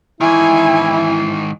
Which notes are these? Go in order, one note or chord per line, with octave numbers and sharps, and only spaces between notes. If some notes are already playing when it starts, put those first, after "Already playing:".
G#2 D#3 E3 E4 G#5